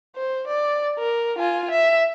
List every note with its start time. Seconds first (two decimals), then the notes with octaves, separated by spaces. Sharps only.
0.16 C5
0.47 D5
0.99 A#4
1.38 F4 G#5
1.71 E5